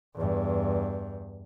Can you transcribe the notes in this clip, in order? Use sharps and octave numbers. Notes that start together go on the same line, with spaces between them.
E2 G2